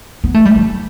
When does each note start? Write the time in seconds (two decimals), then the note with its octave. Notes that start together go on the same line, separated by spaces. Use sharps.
0.24 B3
0.34 A3
0.45 G3
0.56 A3